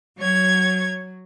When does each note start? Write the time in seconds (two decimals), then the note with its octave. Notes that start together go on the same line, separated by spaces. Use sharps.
0.19 F#3 C#5 G#6